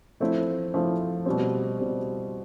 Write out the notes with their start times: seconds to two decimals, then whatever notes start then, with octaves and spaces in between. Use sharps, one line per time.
0.20 F3 A3 C4 E4
0.74 F3 A3 C4 E4
1.26 B2 G3 C4
1.79 B2 G3 C4